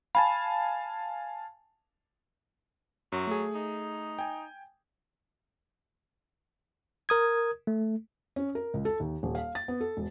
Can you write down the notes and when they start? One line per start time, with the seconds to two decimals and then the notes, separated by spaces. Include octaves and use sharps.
0.15 F5 G#5 A5 B5
3.12 F#2 F#3
3.27 A3 G#4
3.55 D#4
4.19 G5 G#5
7.09 A#4 D#6 G#6
7.67 A3
8.36 C#4
8.55 A#4
8.74 C#2
8.85 A4
9.00 D#2
9.23 D#1
9.35 F5
9.55 A6
9.68 B3
9.81 A4
9.97 E1